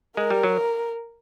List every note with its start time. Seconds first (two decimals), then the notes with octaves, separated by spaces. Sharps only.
0.17 G#3 A#4
0.30 G3
0.43 F#3